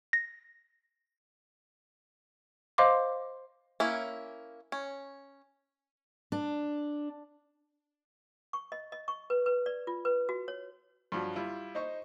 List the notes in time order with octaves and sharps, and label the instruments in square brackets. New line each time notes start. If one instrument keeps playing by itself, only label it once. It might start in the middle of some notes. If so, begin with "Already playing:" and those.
[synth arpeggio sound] A#6
[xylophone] C5 D#5 F5 C6 D6
[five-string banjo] A#3 C#4 E4
C#4
[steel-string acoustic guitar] D4
[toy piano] C#6
D#5
D#5
C#6
B4
B4
D5
F4
B4
F#4
C#5
[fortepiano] G2 F3 F#3
G3 E4 F4
D#4 C5 D#5 C#6